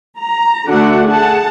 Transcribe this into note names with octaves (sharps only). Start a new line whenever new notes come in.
A#5
D3 A3 D4 F#4 F#5
G#4 F#5 A5